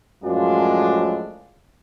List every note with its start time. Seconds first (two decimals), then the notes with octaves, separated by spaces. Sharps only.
0.24 F#2 A2 F3 G#3 D4